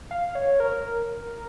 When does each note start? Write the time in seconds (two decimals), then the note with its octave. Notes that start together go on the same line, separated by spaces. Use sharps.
0.11 F5
0.35 C#5
0.60 A#4